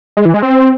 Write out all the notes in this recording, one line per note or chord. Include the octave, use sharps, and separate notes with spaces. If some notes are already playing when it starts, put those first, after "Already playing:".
G#3
E3
G#3
C4